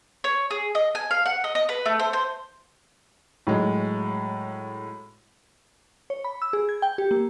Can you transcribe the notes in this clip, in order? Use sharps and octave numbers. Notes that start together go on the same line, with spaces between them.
C#5
G#4
D#5
G#5
F5
F#5
D#5
D#5
B4
A3
C5
C5
A2 F#3 G#3
C#5
B5
E6
G#4
G#6
G5
G4
A#3